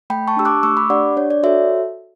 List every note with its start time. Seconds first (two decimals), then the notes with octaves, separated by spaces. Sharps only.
0.10 A3 G5 B5
0.28 A5 C#6
0.37 D4 G4 E6
0.45 D6 F#6
0.63 A3 C#6 E6
0.77 B5 D6
0.90 D4 G4 D5 F#5
1.17 D4 C#5
1.30 D5
1.43 F#4 A4 C#5 E5